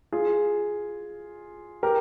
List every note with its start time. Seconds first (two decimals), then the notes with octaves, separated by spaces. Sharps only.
0.12 F4 G#4
1.83 G4 A#4